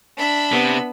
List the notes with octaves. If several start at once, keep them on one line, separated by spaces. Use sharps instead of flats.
D4 E5 B5
C3 B3